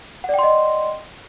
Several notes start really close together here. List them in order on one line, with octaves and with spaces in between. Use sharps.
F#5 D5 G5 C6 D#5